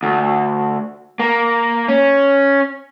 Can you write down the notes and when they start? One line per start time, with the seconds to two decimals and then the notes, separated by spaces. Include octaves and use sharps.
0.03 D2
1.20 A#3
1.88 C#4